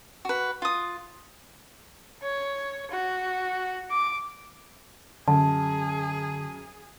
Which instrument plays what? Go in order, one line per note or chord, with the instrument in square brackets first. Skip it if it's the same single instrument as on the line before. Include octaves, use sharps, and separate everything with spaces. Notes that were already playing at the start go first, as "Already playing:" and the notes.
[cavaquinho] F#4 B4
F4 D#6
[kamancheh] C#5
F#4
D6
[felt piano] F#2 [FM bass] D3 [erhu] G#4 [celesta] A5